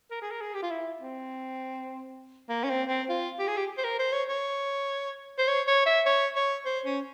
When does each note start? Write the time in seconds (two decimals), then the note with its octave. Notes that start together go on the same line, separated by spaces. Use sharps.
0.11 A#4
0.22 G#4
0.31 A#4
0.41 G#4
0.54 G4
0.62 F4
0.71 E4
1.01 C4
2.49 A#3
2.64 C#4
2.69 C4
2.89 C4
3.09 F4
3.39 G4
3.47 G#4
3.57 G4
3.78 C5
3.84 A#4
3.99 C5
4.13 C#5
4.28 C#5
5.38 C5
5.48 C#5
5.67 C#5
5.86 E5
6.06 C#5
6.36 C#5
6.66 C5
6.85 C#4